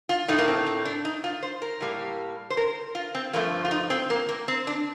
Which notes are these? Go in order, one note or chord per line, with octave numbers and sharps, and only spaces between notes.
F4
A2 A3 D#4
A#3
C4
C4
D4
D#4
F4
C5
A#4
A2 G3 A#3
C5
A#4
F4
C4
G2 F3 A3 A#3
F4
D#4
C4
A#3
A#3
C4
D4